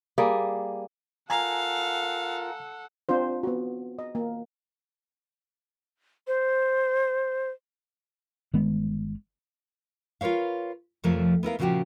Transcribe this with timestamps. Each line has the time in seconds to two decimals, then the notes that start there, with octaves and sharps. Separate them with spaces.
0.18 G3 A#3 G#4
1.30 F4 A4 A#4 F5 F#5 G#5 A#5
3.09 C4 D4 F4 C5
3.43 B3 F#4
3.99 D#5
4.15 A#3
6.27 C5
8.53 G1 D#3 G#3 B3
10.21 F4 A#4 B4 C#5 F5
11.04 F2 C3 F3 A3 A#4 C#5
11.43 B3 E4 A#4 F5
11.59 A#2 C#3 F3 E4 F#4 G4